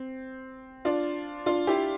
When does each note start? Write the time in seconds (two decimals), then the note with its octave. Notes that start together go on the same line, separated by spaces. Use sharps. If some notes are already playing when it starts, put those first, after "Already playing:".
Already playing: C4
0.85 D4 F4
1.46 D4 F4
1.67 E4 G4